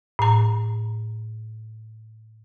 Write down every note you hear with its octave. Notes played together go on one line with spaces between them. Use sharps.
A2 A#5